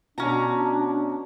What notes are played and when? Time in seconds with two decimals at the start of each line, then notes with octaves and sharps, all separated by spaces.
0.18 B2 C#4 D4 F#4 A#5